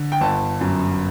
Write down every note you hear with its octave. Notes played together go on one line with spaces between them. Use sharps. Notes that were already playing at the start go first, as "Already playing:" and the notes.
Already playing: D3
G5
G1 A5
F#2